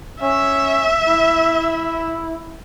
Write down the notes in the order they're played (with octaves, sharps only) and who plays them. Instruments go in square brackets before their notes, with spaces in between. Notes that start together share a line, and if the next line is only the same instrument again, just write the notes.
[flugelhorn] C#4 [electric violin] E5
[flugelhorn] E4